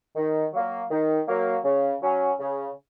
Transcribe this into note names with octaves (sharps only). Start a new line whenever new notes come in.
D#3
F#3 A#3
D#3
F#3 A#3
C#3
F#3 C#4
C#3